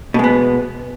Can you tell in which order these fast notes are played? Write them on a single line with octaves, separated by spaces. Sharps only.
B2 G#3 B3